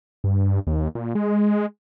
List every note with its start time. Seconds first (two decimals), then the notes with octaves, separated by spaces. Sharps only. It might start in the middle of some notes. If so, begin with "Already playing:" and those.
0.24 G2
0.67 D#2
0.95 A#2
1.15 G#3